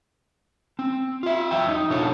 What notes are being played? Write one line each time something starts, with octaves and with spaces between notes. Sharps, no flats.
C4
F4 E5
E2 F#3 E5 G5
D#4
B2 D4 F4 A4 C#5